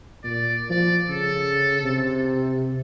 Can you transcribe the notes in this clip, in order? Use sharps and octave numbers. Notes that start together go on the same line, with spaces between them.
A#2 D5
F3 D5
C#3 A4
C3